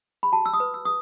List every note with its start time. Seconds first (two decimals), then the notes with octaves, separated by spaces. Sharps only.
0.23 B5
0.32 F#4 A5
0.46 E6
0.54 D#6
0.60 B4
0.74 E6
0.85 D#6